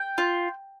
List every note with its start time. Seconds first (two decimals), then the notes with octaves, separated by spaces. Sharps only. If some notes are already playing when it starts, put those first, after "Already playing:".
Already playing: G5
0.18 F4